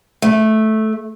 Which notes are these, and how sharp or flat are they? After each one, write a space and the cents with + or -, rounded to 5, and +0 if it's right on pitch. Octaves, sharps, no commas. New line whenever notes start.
A3 -10